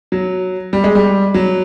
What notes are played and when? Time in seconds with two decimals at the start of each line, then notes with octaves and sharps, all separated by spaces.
0.12 F#3
0.73 G3
0.84 G#3
0.95 G3
1.34 F#3